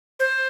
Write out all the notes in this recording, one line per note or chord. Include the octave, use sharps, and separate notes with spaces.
C5